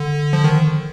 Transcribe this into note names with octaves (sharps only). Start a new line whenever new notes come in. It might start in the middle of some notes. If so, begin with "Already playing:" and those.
Already playing: D3
F3
D#3